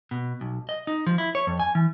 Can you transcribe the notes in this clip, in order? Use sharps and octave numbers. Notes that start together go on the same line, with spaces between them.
B2
B1
D#5
D#4
F3
E4
C#5
F2
G#5
E3